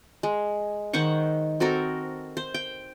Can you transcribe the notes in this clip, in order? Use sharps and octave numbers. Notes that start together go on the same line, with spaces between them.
G#3
D#3 C5 F#5 C#6
C4 F#4 A4 A#4
C5
G5